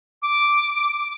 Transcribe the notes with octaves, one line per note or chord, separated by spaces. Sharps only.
D6